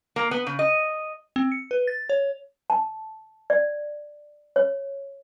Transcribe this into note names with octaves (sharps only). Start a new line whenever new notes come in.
A#3
B3
C#3
D#5
C4
C#7
B4
A6
C#5
A5
D5
C#5